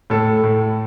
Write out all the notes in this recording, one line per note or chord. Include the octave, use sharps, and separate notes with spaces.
A2 A4
A2